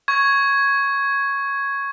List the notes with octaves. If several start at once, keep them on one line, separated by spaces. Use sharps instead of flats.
C#6 G#6